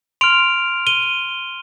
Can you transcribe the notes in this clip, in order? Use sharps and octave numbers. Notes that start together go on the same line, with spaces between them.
C6 F6 D7 F7
D#7 G7